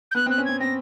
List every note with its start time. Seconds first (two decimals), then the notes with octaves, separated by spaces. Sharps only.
0.11 G6
0.15 B3 F#6
0.26 C4 F#6
0.38 C#4
0.45 C4 G#6
0.60 C4 A#6